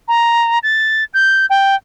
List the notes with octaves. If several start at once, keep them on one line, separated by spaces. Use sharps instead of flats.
A#5
A6
G6
G5